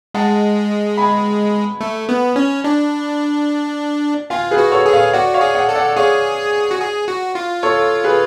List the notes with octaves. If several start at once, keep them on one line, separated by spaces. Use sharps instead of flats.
G#3 F#5 A5
G#5 B5
A3
B3
C#4
D4
F4 F5 G#5
G#4 B4
F#4
A4 C#5
G#4
C#5 F5
F#4 D5 F#5
C#5 F5
G#4
D5 F#5
A4
D5 F#5
G#4 C#5 F5
F#4
G#4
F#4
F4
A4 C#5
G#4 B4